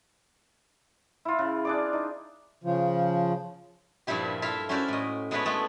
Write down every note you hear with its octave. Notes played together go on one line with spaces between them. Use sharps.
E4 F4
C#3
D4 G#4 D5
D#4
C#3 F3
G2 A#2 F3 G3 E4 G4
E4 F4 A4 E5 F5
C#4 E4 F#4 A#4 C5 D5
A2 D#5
G#3 B3 D4 E4 B4 C#5
G#3 A3 B3 A4